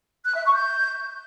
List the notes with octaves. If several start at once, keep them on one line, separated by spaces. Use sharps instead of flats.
F#6
E5
C#6
G6